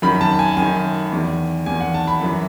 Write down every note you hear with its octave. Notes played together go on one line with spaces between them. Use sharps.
F#2 D#3 B5
A5
G#5
F#2 G#5
D#3
E2 D#3
E2 D#3 G#5
F#5
A5
B5
F#2 E3